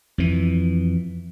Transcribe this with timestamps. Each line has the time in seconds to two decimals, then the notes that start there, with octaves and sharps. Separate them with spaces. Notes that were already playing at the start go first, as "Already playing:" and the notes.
0.18 F2 E3